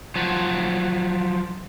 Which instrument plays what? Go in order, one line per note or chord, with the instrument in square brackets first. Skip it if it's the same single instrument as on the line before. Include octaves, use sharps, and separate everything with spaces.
[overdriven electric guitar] F3 F#3